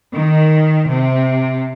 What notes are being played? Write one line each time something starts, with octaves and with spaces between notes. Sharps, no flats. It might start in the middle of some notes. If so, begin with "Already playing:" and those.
D#3
C3